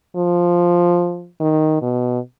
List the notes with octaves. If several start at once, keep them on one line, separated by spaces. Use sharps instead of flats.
F3
D#3
B2